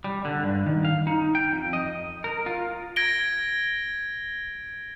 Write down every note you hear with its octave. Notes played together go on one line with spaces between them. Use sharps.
G3
D3
G2
D#3
F5
D#4
G5
F2
D#5
A#4
F4
G#6 A#6 D7 G7